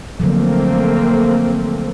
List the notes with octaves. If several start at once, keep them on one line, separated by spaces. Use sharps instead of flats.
D3 F3 F#3 A3 A#3 C4